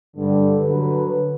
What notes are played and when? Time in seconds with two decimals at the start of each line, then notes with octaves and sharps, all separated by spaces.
0.16 G2 D3
0.59 D3 F#3 B4